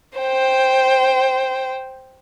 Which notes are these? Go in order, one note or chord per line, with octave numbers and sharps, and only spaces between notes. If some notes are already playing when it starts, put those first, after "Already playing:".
C5 G5